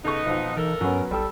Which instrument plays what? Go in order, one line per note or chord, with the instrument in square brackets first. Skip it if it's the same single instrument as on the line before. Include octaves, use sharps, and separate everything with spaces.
[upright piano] C#3 A4 C#6 [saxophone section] B3 D#4
[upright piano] B1 F2 [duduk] F3
[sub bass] E3 [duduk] D#4 [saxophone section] A4 A#4
[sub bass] G2 [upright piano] F#3 B3 [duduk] C#4
[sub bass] A#1 [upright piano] G3 G5 E6 [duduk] A4